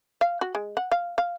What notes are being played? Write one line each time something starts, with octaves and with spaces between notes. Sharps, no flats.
F5
F#4
G#3
F#5
F5
F5